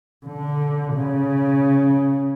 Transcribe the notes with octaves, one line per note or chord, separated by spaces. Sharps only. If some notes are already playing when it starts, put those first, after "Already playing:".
D3
C#3